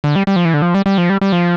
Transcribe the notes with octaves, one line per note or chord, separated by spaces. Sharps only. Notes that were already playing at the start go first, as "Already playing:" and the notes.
D3
G3
G3
F3
E3
D3
F3
G3
G3
F3
G3
G3
F3